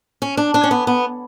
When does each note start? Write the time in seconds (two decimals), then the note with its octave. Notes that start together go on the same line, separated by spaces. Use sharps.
0.22 C#4
0.37 D4
0.54 D4
0.64 C#4
0.71 B3
0.87 B3